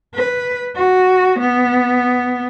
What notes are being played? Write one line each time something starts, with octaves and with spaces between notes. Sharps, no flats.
B4
F#4
B3